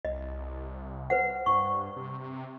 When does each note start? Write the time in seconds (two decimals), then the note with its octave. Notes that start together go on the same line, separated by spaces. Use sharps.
0.05 C2 D#5
1.10 B4 C5 F#5
1.46 G2 C#6
1.96 C3